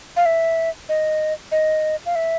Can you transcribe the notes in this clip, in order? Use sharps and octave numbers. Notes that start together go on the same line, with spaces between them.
F5
E5
D#5
D#5
F5
E5